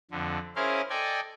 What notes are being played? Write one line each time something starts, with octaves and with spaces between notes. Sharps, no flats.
F2 D3
C#4 E4 G#4 A#4 C5 F5
A4 D5 D#5 G5 G#5